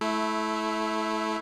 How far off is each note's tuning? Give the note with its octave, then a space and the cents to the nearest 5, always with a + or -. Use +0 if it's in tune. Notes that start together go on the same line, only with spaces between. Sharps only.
A3 -20 E4 +0